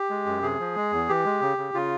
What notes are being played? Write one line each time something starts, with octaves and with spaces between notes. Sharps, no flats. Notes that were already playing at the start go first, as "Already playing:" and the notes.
Already playing: G4
G#3
F#2
C3 G#4
F3
G#3
E2
E3 G4
G#3
C#3
C#3
C#3 F4